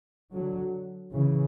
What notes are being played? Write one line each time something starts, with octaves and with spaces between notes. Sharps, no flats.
D3 F#3
C#3 E3